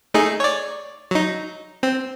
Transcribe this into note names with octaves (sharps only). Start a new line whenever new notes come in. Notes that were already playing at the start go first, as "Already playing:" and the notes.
A3 D#4 G#4
C#5 D5
F#3 D#4
C4